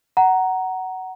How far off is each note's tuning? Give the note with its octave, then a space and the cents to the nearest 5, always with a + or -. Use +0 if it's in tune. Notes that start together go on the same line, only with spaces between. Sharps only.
F#5 +15 A#5 +0